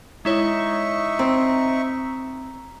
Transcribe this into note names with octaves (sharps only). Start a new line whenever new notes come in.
G#3 D#4 E4 C#5 E5 C#6
C4 A#5